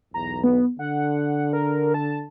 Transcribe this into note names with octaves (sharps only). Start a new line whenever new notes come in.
B1 E2 A#5
B3
D3 F#5
A#4
A5